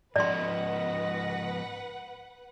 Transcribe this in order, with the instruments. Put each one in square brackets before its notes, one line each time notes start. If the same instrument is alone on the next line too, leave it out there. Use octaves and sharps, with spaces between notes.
[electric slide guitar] G#2 F3 C#4 [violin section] B4 F#5 [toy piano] D5 C6 [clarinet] D#5